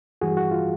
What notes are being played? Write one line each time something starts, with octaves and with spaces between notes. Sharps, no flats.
G2 E3 G3 F#4 G#4
F#4
F4